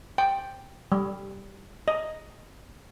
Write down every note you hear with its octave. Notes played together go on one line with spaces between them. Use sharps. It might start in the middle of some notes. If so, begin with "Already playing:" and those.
G5
G3
D#5